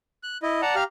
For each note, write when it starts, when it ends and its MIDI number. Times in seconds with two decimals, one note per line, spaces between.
0.23 0.38 90
0.43 0.61 64
0.43 0.61 75
0.62 0.75 74
0.62 0.75 78
0.62 0.75 81
0.62 0.75 82
0.76 0.84 67
0.76 0.84 77
0.76 0.84 82
0.76 0.84 89